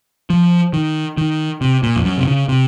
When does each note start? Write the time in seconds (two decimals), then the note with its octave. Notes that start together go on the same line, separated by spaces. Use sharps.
0.30 F3
0.73 D#3
1.18 D#3
1.61 C3
1.83 A#2
1.96 F2
2.05 F#2
2.17 C3
2.28 C#3
2.49 C3